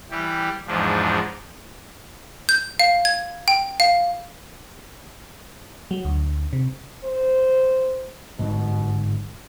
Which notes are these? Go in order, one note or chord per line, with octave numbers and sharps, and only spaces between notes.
E3 G3 G4
E2 G#2 F3 D4
G6
F5
G#6
G5
F5
F#3
D2
C3
C5
G1 G#2 B2 F#3